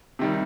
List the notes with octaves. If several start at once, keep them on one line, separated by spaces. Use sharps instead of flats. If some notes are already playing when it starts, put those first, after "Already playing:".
C3 D#3 G3